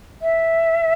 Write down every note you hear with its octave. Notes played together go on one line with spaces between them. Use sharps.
E5